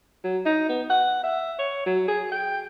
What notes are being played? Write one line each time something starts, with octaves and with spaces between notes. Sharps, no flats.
F#3
D#4
B3
F#5
E5
C#5
F#3
G#4
G5